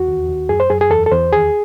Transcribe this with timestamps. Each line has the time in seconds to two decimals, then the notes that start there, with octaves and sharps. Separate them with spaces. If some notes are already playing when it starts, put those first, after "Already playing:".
Already playing: E2 F#4
0.08 D#2
0.29 D#2
0.49 F#2 G#4
0.60 C5
0.70 F#2 G#4
0.81 G#4
0.91 E2 A4
1.06 A4
1.11 E2 C5
1.32 D#2 G#4